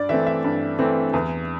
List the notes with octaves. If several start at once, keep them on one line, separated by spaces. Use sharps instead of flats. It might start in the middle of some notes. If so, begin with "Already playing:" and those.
Already playing: G2 D5
E3 A3 C4 E5
E5
G2
E3 A3 C4
E2